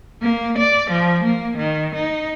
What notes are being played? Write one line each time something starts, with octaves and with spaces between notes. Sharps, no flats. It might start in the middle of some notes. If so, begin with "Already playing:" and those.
A#3
D5
F3
A#3
D#3
D#4